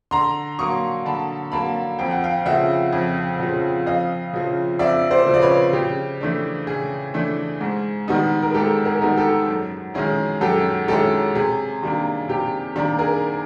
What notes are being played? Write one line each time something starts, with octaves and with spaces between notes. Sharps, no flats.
D3 A#5 C6
F#3 A#3 C#6 D#6
D3 A5 B5
F#3 A#3 A5 B5
F2 G5
F#5
F5 G5
C#3 F3 E5 F#5
F2
C#3 F3
F2 D#5 F5
C#3 F3
F2 D5 E5
C5 D5
C#3 F3
D5
B4 C#5
C#3 G4
E3 A3 D4
C#3 G#4
E3 A3 D4
G#2
D#3 G3 B3 D#4
A#4
G#2 G4 A4
G#4 A#4
D#3 G3 B3 D#4
G4 A4
F#2
D#3 G#3 C#4 E4 G#4
F#2 G4 A4
D#3 G#3 C#4 E4 G4 A4
C3 G#4
D#3 G3 A#3 D4
C3 G4
D#3 G3 A#3 D4
G#4 A#4